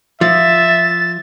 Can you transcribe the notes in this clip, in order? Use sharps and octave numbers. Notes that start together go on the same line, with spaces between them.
F3 E5 A6